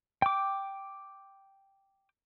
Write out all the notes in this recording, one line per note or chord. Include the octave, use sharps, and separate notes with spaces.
G5 D6